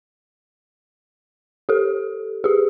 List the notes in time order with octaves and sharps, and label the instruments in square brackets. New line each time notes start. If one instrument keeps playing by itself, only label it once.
[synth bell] G4 A4
G4 G#4